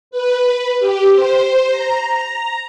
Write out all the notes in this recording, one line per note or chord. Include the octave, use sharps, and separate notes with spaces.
B4
G4
C5
A#5